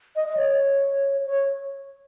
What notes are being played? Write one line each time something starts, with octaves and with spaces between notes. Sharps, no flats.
D#5
D#5
C#5
C#5